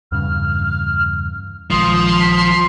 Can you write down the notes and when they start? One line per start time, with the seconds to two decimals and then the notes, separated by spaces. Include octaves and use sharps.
0.12 E2 G2 C#3 F6
1.71 A#1 D#3 F3 G#3 C6 D#6
2.20 B6